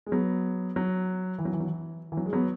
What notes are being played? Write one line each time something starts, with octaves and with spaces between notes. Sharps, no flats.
G#3
F#3 B3
F#3
E3
F#3
E3
F#3
E3
E3
F#3
G#3
F#3 B3